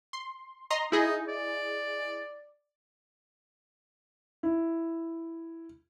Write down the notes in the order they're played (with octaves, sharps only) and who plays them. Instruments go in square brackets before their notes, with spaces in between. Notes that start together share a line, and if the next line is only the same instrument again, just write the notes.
[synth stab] C6
D#5 A#5 C6
[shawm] D#4 [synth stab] E4 G#4 D#5
[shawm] D5
[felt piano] E4